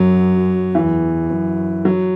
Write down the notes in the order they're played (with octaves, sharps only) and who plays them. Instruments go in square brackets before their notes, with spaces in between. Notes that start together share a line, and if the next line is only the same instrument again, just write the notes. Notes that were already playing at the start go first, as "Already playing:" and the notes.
Already playing: [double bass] F#2 [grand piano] F#3
[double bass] E2 [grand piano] E3
[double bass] F#2
[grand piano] F#3